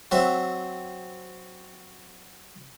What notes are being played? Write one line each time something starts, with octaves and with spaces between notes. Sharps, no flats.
F#3 C4 E5